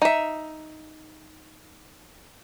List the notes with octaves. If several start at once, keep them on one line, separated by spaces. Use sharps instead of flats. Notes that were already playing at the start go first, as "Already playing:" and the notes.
D#4 E5